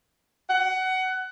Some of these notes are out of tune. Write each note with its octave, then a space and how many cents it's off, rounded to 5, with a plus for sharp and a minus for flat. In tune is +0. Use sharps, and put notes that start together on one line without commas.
F#5 +20